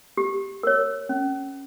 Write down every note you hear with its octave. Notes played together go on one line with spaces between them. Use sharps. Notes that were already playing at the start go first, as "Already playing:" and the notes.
G4
A#4 C#5
C#4